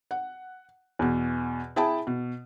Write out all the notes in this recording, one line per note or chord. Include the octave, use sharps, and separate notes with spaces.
F#5
E2 B2
E4 G#4 G5 A5 B5
B2